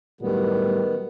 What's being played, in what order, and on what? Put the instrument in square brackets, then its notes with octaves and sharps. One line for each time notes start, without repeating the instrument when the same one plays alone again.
[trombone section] A2 F#3 G3 [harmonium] D#3 B3